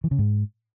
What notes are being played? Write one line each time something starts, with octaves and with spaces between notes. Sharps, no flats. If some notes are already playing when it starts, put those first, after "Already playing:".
E3
C#3
G#2